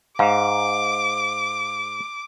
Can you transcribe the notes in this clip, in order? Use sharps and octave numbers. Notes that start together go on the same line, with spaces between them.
G#2 F5 D6